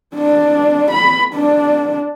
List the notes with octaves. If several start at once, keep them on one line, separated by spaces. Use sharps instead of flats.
D4
B5
D4